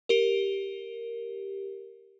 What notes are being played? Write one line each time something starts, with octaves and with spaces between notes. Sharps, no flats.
G4 A#4